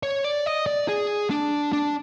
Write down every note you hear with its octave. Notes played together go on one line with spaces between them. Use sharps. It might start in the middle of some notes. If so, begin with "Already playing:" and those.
C#5
D5
D#5
D5
G#4
D4
D4